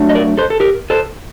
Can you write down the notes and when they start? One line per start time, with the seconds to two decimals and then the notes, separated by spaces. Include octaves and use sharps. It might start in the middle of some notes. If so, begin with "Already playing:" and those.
Already playing: F#3 A3 D4
0.09 D#5
0.15 A#4 D5
0.37 A4 C5
0.50 A4
0.60 G4 A#4
0.90 A4 C5